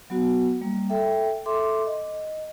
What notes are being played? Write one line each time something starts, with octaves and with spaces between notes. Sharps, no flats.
F#3 B3 F#4
G3 A#3
A4 E5 G5
A4 E5 C6 D6
D#5